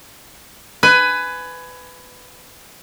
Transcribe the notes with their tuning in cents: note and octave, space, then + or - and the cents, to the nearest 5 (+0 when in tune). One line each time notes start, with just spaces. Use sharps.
B4 +20 G#5 +10